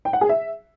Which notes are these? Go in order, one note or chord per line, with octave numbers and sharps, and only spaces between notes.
G5
F#5
G#4
E5